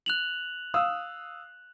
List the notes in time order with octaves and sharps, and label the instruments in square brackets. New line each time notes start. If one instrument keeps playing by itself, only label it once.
[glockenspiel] F#6 F7 F#7
[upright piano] F5 D#6 E6